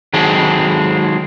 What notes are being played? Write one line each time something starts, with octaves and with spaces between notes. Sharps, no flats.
D#3 F#3 G#3 C4 G#4 A4